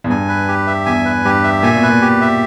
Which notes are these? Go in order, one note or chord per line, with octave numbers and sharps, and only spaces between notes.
E2
G2 G#5
B4
G4
E5
E2 G#5
B4
G2 G4
E5
A#2 G#5
B2
B4
A#2
G4
E5